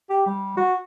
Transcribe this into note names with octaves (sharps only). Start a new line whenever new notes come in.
G4
G3
F#4